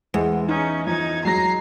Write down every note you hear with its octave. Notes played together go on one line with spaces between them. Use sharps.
E2 G#3
C#4 D#4
F3 D#4 G#6
F#3 G#3 A#5 A#6 C7